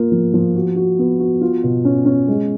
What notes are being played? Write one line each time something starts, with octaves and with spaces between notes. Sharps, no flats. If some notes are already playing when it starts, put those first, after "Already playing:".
Already playing: A#3 F4
F3
F3
F#4
F#4
B3
F#4
F4
B2
C#4
C#4
G#3